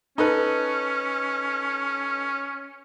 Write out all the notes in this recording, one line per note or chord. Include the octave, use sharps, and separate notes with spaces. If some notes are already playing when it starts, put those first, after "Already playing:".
C#4 D#4 A4 B4